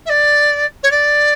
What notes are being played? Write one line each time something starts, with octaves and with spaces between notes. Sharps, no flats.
E5
D5
C#5
D5